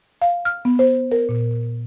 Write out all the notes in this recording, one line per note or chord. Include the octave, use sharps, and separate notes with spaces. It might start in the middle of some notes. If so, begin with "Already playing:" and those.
F5
F6
B3
C5
A#4
A#2